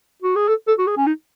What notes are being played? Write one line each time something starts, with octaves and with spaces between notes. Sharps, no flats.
F#4
G#4
A4
A4
F#4
G#4
C#4
D#4